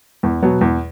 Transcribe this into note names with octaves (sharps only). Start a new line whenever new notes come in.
E2
B2 F#3 B3
E2